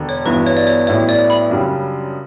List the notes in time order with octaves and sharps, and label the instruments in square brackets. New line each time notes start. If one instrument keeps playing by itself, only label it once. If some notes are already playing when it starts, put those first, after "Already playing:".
Already playing: [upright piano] E1 D3
[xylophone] C#5
[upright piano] G1 G2 E3 B3 F#4 [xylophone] B4
[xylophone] C#5
D5
C#5
[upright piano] A1 A2 F#3 B3 E4 [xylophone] C#5
[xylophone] D5
B5
[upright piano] F#2 C#3 G3 D4 F#4